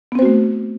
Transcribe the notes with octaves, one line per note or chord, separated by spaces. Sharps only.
A3 B3 C4 F#4 C5